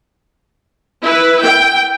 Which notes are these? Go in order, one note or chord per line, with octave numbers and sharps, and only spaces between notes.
E4 B4
G5